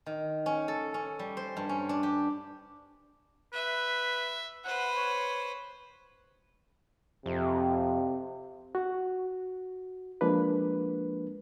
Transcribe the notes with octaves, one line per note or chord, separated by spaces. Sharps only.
D#3
C#4
A4
C#4
G3
C5
G2
C#4
D4
G4
B4 E5
B4 C5 F#5
C#5
F2 C3
F#4
F3 G#3 A#3 D4 B4